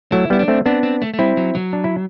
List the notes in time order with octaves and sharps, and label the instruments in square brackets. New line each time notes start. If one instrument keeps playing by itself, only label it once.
[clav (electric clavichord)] F#3 A3 [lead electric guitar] E4
[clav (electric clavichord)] G3 B3 [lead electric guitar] E4
[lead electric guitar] D4
[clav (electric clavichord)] A3 C4
[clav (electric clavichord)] B3 D4 [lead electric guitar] C4
[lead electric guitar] C4
A3
A3
[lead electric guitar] G3 [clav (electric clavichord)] C4 E4
[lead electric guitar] F#3
F#3
[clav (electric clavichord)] D4
E4